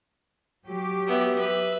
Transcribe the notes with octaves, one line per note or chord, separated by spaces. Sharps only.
F#3 G4
B3 E5
B4 E5